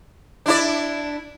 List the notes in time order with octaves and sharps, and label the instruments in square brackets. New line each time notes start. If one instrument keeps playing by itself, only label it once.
[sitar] D4 E4 D5